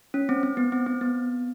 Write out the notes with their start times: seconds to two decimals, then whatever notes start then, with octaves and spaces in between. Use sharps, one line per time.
0.14 C#4
0.29 C4
0.43 C4
0.57 B3
0.72 C4
0.86 C4
1.01 B3